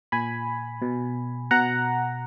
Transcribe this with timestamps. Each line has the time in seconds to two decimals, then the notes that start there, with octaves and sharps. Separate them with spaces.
0.12 A#2 G#5 B5
0.82 B2
1.51 B2 F#5 A#5